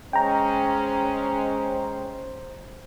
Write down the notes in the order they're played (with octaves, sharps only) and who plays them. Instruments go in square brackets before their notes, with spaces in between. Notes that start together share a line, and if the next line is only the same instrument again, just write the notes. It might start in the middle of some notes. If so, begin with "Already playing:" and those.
[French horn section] G#3 C#4 [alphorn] C5 [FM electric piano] G5 A#5